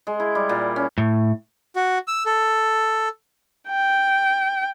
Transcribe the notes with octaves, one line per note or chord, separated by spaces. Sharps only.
G#3
E4
G3
A#2
C#4
A2
F#4
E6
A4
G5